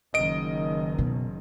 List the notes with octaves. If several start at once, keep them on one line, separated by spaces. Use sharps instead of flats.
F#1 D#3 D#5 D7
B2